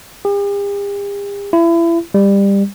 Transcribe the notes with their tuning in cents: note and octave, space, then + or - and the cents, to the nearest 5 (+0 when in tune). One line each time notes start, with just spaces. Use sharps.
G4 +45
E4 +30
G3 +20